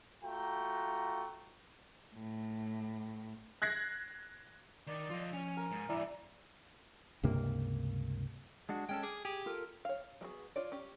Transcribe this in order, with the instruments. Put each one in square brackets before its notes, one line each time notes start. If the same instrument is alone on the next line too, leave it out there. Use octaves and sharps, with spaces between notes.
[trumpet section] A3 F4 F#4 G5 A#5
[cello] A2
[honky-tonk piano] F#6 G#6 A#6 C7
[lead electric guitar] D#3 D#4 [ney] D5
[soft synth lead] F3 [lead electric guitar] F4 D#5
[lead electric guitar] C#4 [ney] G#5
[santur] A#4
[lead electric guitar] G#2
[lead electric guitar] G2 E3 [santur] E4 A#4 D5
[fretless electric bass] C#2 G2 C3 A#3
[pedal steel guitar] G#3 D4 F#4
[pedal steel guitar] G#3 C#4 A4 [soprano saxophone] G5
[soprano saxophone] G#4 [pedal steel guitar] D6
[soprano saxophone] G4 [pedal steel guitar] G#4
[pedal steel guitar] F4 A4 A#4
[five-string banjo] C#5 F5
G3 B3 F#4 G#4
F4 C#5 D5
C#4 G4